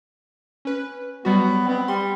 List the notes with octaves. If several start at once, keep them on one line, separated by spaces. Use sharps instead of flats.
C#4 B4
F#3 G3 B3 F#4
B3 C4
G3 C6